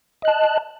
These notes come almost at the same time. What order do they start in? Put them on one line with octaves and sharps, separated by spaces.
D#5 F#6 A5